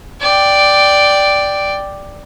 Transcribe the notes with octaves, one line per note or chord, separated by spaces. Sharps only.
D5 G5